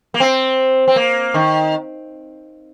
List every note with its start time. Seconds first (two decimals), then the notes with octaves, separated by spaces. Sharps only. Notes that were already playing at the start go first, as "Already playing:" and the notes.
0.14 A#3
0.20 C4
0.88 C4
0.96 A#3
1.34 D#3